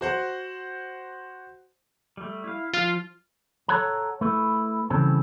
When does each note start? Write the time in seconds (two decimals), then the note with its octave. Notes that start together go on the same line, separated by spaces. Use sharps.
0.01 F#4 C5 F#5
2.17 G3 A3
2.44 E4 F5
2.74 F3 F4 F6
3.68 A4 C#5 F#5 A5 A#5
4.21 A3 E4 B4
4.90 C#3 E3 G3 C4 A4